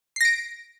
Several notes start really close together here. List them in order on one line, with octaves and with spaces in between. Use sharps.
C7 A#6 D7